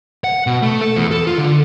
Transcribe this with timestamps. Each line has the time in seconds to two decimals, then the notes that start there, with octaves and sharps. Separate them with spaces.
0.24 F#5
0.47 B2
0.62 A3
0.81 A4
0.96 E2
1.11 A4
1.27 F4
1.38 D3